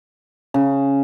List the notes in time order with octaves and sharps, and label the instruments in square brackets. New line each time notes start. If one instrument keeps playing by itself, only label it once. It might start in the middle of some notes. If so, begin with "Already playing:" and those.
[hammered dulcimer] C#3